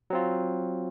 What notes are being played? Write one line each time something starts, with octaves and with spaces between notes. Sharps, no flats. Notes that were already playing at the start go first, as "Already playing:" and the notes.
F#3 C4 F4